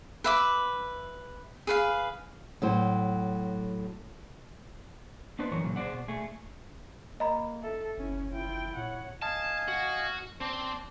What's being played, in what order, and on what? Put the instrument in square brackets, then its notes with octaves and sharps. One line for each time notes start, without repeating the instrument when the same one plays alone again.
[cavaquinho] B4 E5 D6
G#4 B4 F5
[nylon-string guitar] A2 F#3 C5
[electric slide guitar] B3 D4 D#4 B4 C5
F#2 A2 E3 A#4 C#5
A#2 C#3 F#3 C4
G#4 C5 D5 F#5
B2
A3 G#4
[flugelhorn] A#3 [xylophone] D#5 A#5 B5
[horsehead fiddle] A4 [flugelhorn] E5
[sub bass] F#1 [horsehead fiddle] C#4 E4
[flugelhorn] E4 [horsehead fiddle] F4 G5
[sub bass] A#2 [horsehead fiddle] C#5 F#5
[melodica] D#5 F5 G#5 [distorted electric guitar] A5
[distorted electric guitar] F#4
[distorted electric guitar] C4 [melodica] D4